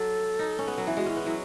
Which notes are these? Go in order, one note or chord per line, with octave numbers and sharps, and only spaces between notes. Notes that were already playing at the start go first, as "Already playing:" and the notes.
Already playing: F#3 A4
D#4
C#4
B3
F#3
E3
G#3 F#4
C#4 E4
B3
F#3 E4